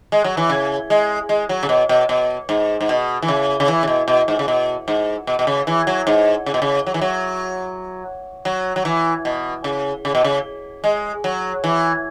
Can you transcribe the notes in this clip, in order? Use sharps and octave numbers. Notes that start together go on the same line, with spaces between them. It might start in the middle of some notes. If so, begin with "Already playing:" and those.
G#3
F#3
E3
C#3
G#3
G#3
F#3
C#3
B2
B2
B2
G#2
G#2
B2
E3
C#3
C#3
E3
C#3
B2
B2
G#2
C#3
B2
G#2
B2
B2
C#3
E3
F#3
G#2
C#3
B2
C#3
F#3
E3
F#3
F#3
F#3
E3
B2
C#3
C#3
B2
C#3
G#3
F#3
E3